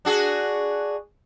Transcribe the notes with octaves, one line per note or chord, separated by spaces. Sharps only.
D4 F#4 G#4